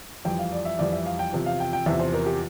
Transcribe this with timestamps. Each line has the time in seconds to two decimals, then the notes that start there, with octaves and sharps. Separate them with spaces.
0.25 F2 E3 G3 G5
0.39 F5
0.52 D5
0.65 E5
0.79 F2 E3 G3 D5
0.92 E5
1.06 F5
1.19 G5
1.33 E2 C3 F3
1.46 F5
1.60 G5
1.73 G5
1.86 E2 C3 F3 E5
2.00 C5
2.13 A#4
2.26 G4